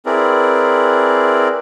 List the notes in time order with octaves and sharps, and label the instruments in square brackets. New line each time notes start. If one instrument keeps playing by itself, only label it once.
[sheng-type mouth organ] C4 E4 G#4 A#4 B4 D5